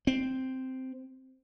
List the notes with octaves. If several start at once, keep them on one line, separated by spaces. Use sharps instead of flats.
C4